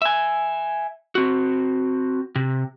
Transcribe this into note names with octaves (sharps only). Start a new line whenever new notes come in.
E5 G#5
C4 F#4
C3